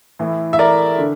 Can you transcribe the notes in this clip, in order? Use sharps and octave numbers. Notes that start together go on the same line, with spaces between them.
A2 E3
E5
A#4 D5
D3